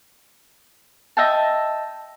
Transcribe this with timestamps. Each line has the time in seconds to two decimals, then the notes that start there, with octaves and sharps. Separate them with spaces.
1.17 D#5 E5 G5 A5